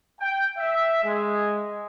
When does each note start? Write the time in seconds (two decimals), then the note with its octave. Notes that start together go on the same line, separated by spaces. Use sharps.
0.19 G5
0.57 E5
1.04 G#3